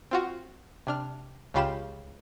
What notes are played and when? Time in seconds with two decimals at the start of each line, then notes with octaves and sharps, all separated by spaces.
0.11 C4 F4 F#4
0.87 C3 D4 F6
1.54 C#2 C#3 F4 G4 B5 E7